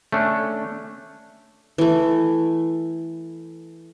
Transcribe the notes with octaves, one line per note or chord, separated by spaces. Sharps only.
A3 C#4 D4
E3 A3